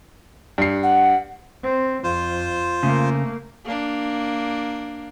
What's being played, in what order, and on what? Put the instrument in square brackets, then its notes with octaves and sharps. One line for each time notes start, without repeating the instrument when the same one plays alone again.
[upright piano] G2 C7
[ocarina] F#5
[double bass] C4
[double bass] F2 [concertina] F4 C5
[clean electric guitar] C#3 [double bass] A3 A#3
[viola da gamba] A#3 D4